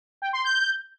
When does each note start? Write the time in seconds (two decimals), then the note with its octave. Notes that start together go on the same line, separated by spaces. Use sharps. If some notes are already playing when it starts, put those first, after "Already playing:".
0.22 G5
0.33 C6
0.44 G6